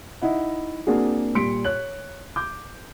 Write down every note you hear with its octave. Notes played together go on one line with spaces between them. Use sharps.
D#4 E4 F#5
A#3 C4 D4 F#4 G#4
A#2 G3 C6 B6 C#7 D7
C#5 F#6 F#7
D6 G6